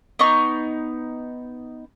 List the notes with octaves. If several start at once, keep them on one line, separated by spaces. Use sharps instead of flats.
B3 D#4 C#6